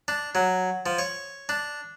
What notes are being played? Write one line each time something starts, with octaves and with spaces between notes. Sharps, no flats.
D4
F#3
F3
C#5
D4